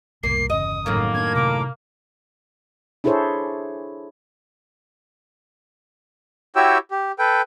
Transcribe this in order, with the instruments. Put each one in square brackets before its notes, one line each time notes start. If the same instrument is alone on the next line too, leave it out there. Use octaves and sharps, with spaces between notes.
[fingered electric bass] F#1 C2 A2 [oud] A#3 [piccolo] C7
[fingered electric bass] G1 E2 C#3 [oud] D#5 [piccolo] D#6
[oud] F#2 A2 D#3 [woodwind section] A#3
[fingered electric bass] B3 D4 [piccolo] G#6
[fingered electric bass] C3 [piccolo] D6
[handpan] D4 E4 G#4 A4 C5 C#5
[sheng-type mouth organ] E4 F#4 G4 C#5 G5 E6
G4
A4 B4 G5